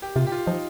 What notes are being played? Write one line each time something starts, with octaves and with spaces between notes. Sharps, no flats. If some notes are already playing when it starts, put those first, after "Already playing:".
G4
C3 F4
G4
F4
F3 D#4